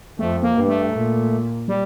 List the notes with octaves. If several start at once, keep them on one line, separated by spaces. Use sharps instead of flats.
F2 A3
A#3
G2
A3
A#2
G3